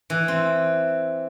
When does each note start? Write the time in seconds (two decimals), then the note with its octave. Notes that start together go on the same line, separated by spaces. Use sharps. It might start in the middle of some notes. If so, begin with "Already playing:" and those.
0.10 E3
0.28 C4